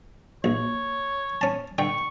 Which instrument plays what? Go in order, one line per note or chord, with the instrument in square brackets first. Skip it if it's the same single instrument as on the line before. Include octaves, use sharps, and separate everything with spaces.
[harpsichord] A#1 [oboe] C#5
[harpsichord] C#4 A5
[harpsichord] D3 G5 [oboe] C#6